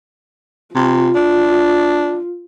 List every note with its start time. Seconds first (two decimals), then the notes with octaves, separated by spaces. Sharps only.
0.75 C3 F4
1.15 D4